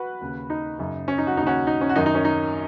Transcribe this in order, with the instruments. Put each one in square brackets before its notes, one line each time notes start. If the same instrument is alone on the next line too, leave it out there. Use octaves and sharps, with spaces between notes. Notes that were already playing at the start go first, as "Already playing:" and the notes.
Already playing: [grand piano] F#4 B4
D#2 C#3
D#4
F#2 C#3
C#4
D#4
F#4
D#2 C#3 D#4
C#4 F#4
D#4
C#4
F#4
F#2 D#3 D#4
D#4
C#4
D#4